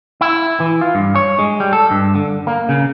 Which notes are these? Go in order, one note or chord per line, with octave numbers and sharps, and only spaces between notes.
E4
E3
F4
G2
C#5
G#3
G3
A4
G2
D3
A#3
C#3